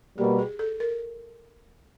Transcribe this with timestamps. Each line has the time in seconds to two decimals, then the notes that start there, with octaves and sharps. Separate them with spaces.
0.17 B2 G3 A#3 G4
0.39 G#4
0.59 A4
0.80 A#4